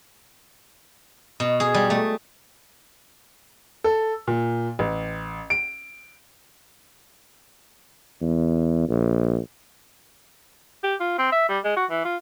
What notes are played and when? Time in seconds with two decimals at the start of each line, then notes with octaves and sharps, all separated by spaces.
1.40 B2
1.60 G#4
1.74 G3
1.90 A3
3.84 A4
4.27 A#2
4.79 A1
5.50 D7
8.22 E2
8.89 A#1
10.83 G4
11.00 F4
11.18 C4
11.32 E5
11.49 G3
11.64 G#3
11.76 F#4
11.90 E3
12.05 F4